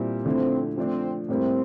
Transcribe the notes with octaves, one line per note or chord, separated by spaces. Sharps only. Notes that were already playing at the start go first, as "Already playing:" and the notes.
Already playing: A#2 G3 C4 E4
D3 F3 A3 C4 E4
F3 A3 C4 D4
A2 G3 A#3 C4 E4